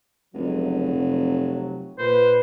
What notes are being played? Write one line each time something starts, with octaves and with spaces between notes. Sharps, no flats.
F1 C#2 F#3
C3 F#3
A#2 B4 C5